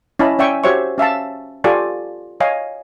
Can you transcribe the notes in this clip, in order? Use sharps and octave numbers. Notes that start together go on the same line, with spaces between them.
C#4 E4 D#5 A5 B5
C#4 D5 E5 G5 G#5 C#6
F#4 G4 C5 C#5 E5 C#6
C#4 E5 F5 A5
F4 G4 A4 D5 G#5 C#6
C#5 D#5 F5 G#5